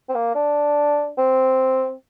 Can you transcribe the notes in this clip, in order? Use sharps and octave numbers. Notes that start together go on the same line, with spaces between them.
C4
A#3
D4
C4